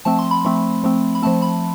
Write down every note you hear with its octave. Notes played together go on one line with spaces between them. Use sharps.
F3 A3 C4 A5
C6
B5
F3 A3 C4
F3 A3 C4
B5
F3 A3 C4 A5
B5